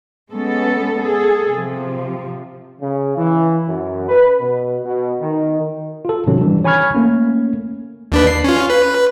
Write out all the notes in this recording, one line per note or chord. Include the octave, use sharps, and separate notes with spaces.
G#3 B3 C#4 A4
G#4 A4
C3 F3
C#3
E3
F#2
B4
B2
B2
D#3
F4 A4
G#2 C3 D#3 F#3 C#4
E3 G3 D4
C#5 G#5 B5 C#6 F6 G#6
A3 A#3 C#4
D#2 D4 B4
C7
C#4 F4
B4